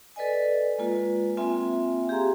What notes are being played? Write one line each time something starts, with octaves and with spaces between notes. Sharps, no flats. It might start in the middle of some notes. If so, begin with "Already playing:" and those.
A4 B4 D5 D#5 G#5
G#3 A#3 F4 B4
A#3 C4 F4 E5 G5 G#5
G4 G#4 F5 A#5 C6